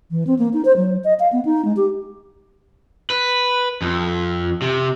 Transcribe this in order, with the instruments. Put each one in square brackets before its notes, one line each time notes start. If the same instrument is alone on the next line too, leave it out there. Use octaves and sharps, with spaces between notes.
[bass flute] E3
C4
A#3
D#4
C5
F#3
D#5
F5
B3
D#4
G#3
G4
[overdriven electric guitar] B4
F2
C3